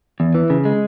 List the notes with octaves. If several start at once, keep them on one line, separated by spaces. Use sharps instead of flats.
E2
E3
C#3
G#3